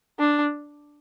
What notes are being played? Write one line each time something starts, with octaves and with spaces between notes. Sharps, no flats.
D4